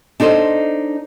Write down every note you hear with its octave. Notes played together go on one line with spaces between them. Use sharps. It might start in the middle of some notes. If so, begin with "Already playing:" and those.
D4 D#4 A4 C5 D#5